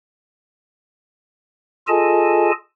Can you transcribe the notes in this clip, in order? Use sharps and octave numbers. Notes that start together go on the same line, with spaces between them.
F4 G#4 A4 D#5 G#5 A5